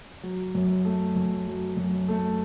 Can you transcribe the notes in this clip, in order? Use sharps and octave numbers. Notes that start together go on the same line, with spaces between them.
F#3
F#2
A3
F#2
F#3
F#2
A3